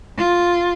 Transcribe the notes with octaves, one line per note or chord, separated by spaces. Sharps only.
F4